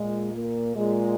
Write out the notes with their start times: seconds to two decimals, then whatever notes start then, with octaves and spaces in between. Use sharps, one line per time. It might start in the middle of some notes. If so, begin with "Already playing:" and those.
Already playing: A#2 G#3
0.34 A#3
0.76 A#2 G#3